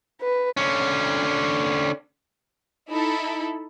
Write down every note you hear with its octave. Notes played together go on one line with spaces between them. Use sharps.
B4
D3 C#4
D#4 E4 A4